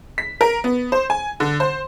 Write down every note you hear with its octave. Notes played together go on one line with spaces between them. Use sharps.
B6
A#4
B3
C5
G#5
D3
C5